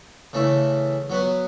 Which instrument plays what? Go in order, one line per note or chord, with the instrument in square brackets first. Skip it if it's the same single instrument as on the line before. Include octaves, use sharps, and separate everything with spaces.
[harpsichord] C#3 E3 A3
F#3 B3 F#4